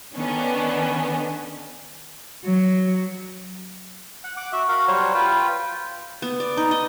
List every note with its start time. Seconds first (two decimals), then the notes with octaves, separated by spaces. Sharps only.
0.13 D3 D#3 B3 C#4 D4
2.44 F#3
4.24 F#5
4.37 F#5 D6
4.53 F#4 E5
4.68 F#4 A#4 F5 F#5
4.88 F#3 G3 C5 C#5
5.14 F4 B4 G5
6.22 B3
6.40 D5
6.57 D#4
6.71 D#5